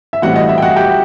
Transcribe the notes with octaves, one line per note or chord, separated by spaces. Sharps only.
E5
A2 E3 G3 C4 F#4 F#5
D#5
E5
G5
F#4 F#5
G4 G5